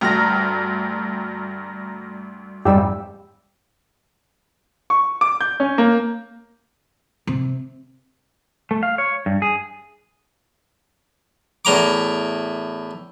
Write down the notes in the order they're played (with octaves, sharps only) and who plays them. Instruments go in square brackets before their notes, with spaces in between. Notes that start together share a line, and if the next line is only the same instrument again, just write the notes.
[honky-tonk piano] D2 G2 G4 [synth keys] A#5 F6 A#6
[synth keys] F2 G#2 E6 [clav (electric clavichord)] G3 G4
[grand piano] C#6
D6
G6
C#4
A#3
[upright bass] C3
[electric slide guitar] A3
F5
C#5
G2
G#4
[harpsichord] E2 A2 A#5 D6